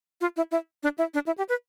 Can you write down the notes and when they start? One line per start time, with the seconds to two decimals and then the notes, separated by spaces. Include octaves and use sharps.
0.21 F4
0.37 E4
0.51 E4
0.83 D4
0.98 E4
1.14 D4
1.27 E4
1.38 G4
1.49 B4